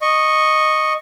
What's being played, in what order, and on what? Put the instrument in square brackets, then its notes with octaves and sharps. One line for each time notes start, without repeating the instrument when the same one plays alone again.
[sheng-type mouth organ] D#5 C#6